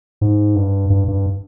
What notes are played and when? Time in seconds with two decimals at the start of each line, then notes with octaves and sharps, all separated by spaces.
0.21 G#2
0.56 G2
0.90 G2
1.08 G2